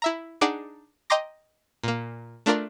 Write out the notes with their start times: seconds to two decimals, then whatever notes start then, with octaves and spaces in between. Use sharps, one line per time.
0.02 E4 E5 A#5
0.41 D4 D#4 G#4 D5 F#5 G#5
1.10 D#5 G5 A#5 C6 D6 A#6
1.84 A#2 A#3
2.46 A3 D4 F4 A#4 D5